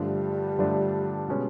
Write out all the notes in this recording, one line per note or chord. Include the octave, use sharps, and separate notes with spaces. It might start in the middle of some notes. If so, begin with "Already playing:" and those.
Already playing: G2 D3 F3 G3 A3 D4
G2 D3 F3 A3 D4
B2 G#3 C#4